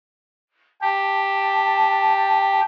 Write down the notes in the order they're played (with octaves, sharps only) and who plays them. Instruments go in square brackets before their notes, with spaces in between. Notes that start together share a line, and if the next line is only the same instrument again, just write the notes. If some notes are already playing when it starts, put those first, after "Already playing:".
[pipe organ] G4 [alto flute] A5